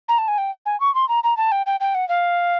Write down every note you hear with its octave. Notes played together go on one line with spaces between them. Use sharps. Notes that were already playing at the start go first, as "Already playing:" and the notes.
A#5
A5
G#5
G5
G#5
C#6
C6
A#5
A#5
A5
G5
G5
G5
F#5
F5